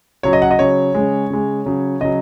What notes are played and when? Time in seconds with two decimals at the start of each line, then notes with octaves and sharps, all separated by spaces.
0.23 C#3 F#3 C#5
0.33 D#5
0.42 F#5
0.51 D#5
0.59 C#3 F#3 C#5
0.95 C#3 G#3
1.30 C#3 G#3
1.66 C#3 F#3
2.01 C#3 F#3 D#5